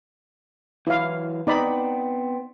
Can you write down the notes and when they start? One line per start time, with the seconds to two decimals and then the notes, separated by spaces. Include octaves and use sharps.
0.87 E3 F#3 E4 F5
1.47 B3 C4 D#4 D5 B5